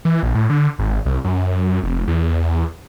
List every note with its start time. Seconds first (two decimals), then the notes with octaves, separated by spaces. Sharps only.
0.05 E3
0.23 A#1
0.35 A2
0.50 D3
0.79 G#1
1.06 C2
1.25 F#2
1.83 F1
2.08 E2